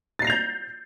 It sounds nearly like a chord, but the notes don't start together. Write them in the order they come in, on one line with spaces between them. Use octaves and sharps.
A6 C7 A#6 F7 G6